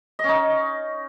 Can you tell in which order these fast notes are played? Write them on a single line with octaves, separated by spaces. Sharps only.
D#5 C#4 D#4